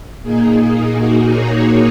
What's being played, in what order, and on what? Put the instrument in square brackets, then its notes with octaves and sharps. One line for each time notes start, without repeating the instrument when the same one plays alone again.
[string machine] A#2 A#3 D#4 G#4
F#4
A#4 C#5